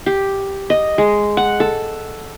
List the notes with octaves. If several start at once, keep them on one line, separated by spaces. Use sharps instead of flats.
G4
D#5
G#3
F#5
A4